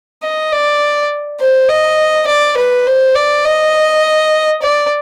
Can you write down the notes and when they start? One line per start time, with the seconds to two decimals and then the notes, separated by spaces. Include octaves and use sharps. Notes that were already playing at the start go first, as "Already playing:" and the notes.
0.22 D#5
0.52 D5
1.40 C5
1.69 D#5
2.27 D5
2.57 B4
2.86 C5
3.15 D5
3.45 D#5
4.62 D5